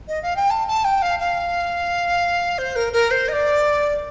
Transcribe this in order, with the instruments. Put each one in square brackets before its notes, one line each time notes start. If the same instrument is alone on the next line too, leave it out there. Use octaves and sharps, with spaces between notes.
[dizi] D#5
F5
G5
A5
A5
G5
F5
F5
C5
A#4
A#4
C5
D#5
D5